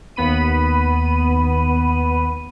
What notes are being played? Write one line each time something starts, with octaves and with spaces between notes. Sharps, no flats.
D#2 B3 B5 D#7